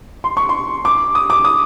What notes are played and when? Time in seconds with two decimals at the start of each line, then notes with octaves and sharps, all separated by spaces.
0.24 C6
0.37 C#6
0.49 C6
0.85 D6
1.15 D#6
1.30 D6
1.45 D#6